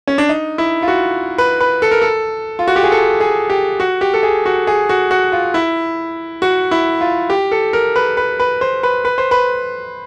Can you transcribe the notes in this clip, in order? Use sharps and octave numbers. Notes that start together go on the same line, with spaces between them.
C#4
D4
D#4
E4
F4
F#4
B4
B4
A4
A#4
A4
F4
F#4
G4
G#4
A4
G#4
G4
F#4
G4
A4
G#4
F#4
G#4
F#4
F#4
F4
E4
F#4
E4
F4
G4
A4
A#4
B4
B4
B4
C5
B4
B4
C5
B4